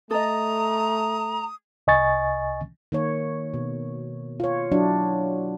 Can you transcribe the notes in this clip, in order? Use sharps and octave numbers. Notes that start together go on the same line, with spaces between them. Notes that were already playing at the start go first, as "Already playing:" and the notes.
A3 A4 D#5 A#5 D#6
C2 D#5 G#5 C#6 A6
D#3 A#3 C#5
B2
F4 C#5
F#3 D4 E4